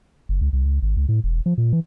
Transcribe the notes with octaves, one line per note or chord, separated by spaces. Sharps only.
F#1
C#2
C2
C#2
G#1
C#2
A2
E1
F3
A#2
E3